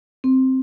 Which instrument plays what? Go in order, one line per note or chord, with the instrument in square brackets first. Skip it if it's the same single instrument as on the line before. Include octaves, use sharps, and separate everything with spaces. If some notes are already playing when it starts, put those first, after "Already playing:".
[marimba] C4